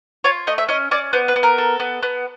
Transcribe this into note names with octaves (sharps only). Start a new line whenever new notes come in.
F4 C#5
A3 D#5
E5
C#4 D#5
C#4 D5
B3 C5
B4
B3
A#4
A4
B3
B3